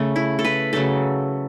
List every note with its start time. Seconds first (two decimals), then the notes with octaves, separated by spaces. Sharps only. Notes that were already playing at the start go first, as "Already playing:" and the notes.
Already playing: C#3 A3
0.16 E4
0.39 A4
0.45 B4
0.73 C#3 F#3 A3 A4